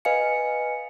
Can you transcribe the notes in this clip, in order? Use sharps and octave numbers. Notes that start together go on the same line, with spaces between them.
B4 D#5 F5 G#5 C#7